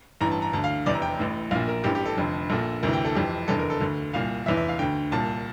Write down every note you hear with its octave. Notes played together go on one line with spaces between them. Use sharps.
A1 G2 E3 A#5
A5
A#5
D2 D3 A5
F5
F1 E2 C3 D5
A#5
G5
A1 A2 E3
A#1 A#2 F5
A#4
A1 G2 E3 G4
G4
A4
F1 F2 D3
A#1 A#2 A4
D2 C3 E3 A#4
G5
A4
F1 F2 E3 G4
F1 E2 D3 A4
A#4
A4
D2 D3
C2 A#2 F5
F1 E2 E3 E5
E5
F5
D2 D3 G5
C2 A#2 A5